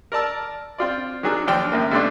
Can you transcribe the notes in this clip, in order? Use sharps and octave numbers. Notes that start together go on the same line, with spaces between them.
A#4 D5 A5 E6
C4 F4 D5
D#3 F#3 D4 G#4
D#2 F3 D4 G5
F#2 A2 A#3
G2 B2 A3 C4 D4